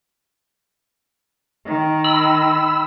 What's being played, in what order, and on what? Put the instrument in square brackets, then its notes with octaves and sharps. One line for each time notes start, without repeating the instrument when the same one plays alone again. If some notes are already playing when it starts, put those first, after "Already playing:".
[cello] D#3
[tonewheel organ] B5 E6